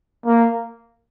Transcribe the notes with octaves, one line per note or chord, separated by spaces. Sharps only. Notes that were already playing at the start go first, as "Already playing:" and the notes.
A#3